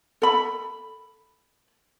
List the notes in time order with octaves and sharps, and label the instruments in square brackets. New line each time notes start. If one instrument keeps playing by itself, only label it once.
[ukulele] A4 B5